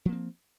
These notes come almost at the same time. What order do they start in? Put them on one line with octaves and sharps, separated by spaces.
F3 A#3 C4